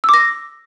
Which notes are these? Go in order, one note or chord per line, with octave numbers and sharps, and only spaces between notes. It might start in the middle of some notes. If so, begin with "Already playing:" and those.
D6 E6 A#6